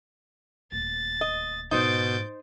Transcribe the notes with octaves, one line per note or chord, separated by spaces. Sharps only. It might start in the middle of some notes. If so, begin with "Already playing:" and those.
D#1 D2 A6
D#5
G#2 B2 D3 D#4 C5 G6 A6 D7